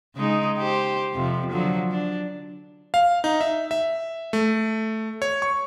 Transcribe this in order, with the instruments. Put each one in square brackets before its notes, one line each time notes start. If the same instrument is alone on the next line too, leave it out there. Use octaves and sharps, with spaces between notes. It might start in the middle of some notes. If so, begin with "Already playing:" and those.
[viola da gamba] C#3 G#3 D#4
G4 C5
F2 C3 F3
D3 F3 F#3
D4
[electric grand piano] F5
D#4
E5
E5
A3
C#5
C#6